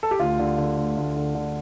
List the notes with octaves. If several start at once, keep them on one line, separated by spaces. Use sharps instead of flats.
A4
G4
D2 F4
D3
D3
D2
D2
D3
D3